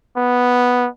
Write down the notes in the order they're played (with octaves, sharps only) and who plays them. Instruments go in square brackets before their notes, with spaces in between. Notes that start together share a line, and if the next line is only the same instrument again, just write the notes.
[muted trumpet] B3